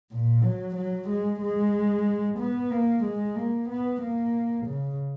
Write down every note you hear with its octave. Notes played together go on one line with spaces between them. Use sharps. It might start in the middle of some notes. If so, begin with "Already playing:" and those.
A#2
F#3
F#3
G#3
G#3
B3
A#3
G#3
A#3
B3
A#3
C#3